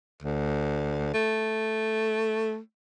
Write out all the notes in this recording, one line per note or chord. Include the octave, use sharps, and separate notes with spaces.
D2
A3